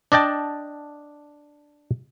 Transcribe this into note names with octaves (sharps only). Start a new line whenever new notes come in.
D4 D5 D#5 G5 A5